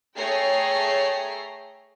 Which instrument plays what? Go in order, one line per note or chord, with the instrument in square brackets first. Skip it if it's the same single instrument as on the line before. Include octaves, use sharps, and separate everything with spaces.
[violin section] A3 G#4 C#5 G5 A#5 C7